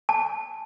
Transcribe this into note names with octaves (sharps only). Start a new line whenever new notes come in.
A5